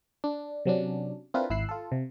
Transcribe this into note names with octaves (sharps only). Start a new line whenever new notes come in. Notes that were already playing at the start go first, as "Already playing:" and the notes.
D4
C3 F#3 C#4 D4
C4 D4 E4 F4 A#4 B4
G#1 E4 E6 F#6 C7
F4 A4
C3